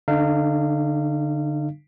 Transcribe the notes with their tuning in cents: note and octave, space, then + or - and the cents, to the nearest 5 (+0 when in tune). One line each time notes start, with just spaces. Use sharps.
D3 -10 D#4 -40 F5 -25